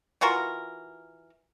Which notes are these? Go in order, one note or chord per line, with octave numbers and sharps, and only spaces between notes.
E3 F4 F#4 A#4